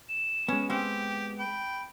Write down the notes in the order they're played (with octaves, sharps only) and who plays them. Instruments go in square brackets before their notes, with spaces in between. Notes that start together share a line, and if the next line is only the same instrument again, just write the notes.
[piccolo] E7
[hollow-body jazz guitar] G#3 B3 [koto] C#4
[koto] C4 F5 [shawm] G4 [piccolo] G5
[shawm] G5 [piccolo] B5